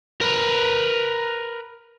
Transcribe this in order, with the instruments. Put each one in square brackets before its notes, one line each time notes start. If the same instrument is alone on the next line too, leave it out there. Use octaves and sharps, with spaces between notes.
[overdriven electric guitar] A#4 B4